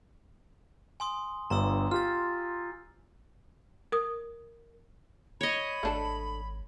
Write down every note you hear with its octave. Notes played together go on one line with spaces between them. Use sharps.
G#5 C6 D#6
G1 G2 A#5 C6 E6
F4 G4 F6 A6
A#4 D#6
C#5 D#5 B5
G#1 A3 D4 A4